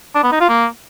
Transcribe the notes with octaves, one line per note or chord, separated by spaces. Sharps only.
D4
B3
D#4
F4
A#3